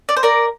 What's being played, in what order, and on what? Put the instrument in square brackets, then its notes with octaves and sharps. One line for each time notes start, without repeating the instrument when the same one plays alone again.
[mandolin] D5
C5
A#4 D5